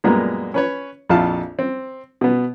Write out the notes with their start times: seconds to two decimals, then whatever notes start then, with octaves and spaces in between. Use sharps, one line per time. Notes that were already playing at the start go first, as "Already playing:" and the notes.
0.04 F#2 A#2 G3 G#3 A#3 B3
0.54 C#4 B4 C#5
1.09 A#1 F2 E4 F4 F5 A5
1.59 C4
2.21 B2 B3